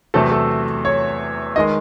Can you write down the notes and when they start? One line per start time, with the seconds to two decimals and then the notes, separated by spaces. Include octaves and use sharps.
0.14 E2 C3 F#3 A3 A4
0.32 A4
0.85 C#5
1.56 D#3 G#3 D#5